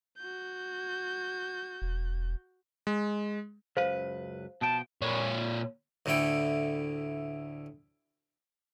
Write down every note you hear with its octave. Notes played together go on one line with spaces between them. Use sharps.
F#4 G6
E1
G#3
C#2 F#2 B4 C5 F5
B2 F3 G5 A5
A#2 C#5
D2 A2 D3 E4 G5